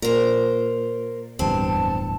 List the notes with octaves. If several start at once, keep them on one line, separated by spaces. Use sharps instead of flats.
A#2 A#4 C5
D1 E2 G2 C4 A5